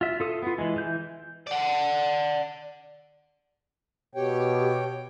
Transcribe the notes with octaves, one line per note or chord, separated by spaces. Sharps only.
F4 E5
F4 A4 D#6
B3 F4
E3 G#3
E3 G6
D5 F#5
B2 G4 C#5 G5